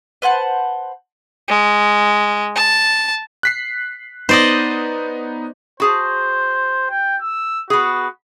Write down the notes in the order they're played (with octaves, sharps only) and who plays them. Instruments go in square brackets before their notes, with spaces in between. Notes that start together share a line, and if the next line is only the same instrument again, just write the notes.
[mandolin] B4 C5 F#5 A5
[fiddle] G#3
A5
[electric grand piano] F#6 B6 C7
[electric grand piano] B3 D#4 [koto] C5 D5 D#5
[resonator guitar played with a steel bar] F#4 G#4 A5 [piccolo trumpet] C5
[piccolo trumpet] G5
E6
[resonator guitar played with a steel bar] B3 G#4 [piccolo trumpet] F#4